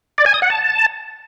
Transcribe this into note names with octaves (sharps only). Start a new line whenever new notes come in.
D5
G#5
D#6
F#5
A5